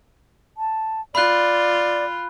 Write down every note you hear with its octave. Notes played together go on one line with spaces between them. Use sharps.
A5
F4 D5 B5 F#6